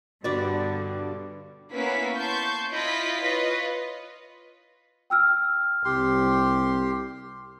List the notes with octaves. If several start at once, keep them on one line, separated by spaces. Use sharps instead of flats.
G2 B2 D3 F#4 D5 B5
A#3 B3 C#4 E4 B6
A5 C6 C#6 G6
E4 F4 D#5 B6
F4 B4 C#5 D#5
G5 E6 F6
C2 G4 C6